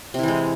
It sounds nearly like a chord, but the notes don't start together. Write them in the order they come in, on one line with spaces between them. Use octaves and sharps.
C3 E4 E3 G#3